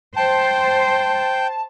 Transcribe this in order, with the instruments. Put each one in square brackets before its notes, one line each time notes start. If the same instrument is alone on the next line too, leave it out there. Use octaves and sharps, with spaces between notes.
[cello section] C5 [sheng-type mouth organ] G5 [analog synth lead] A5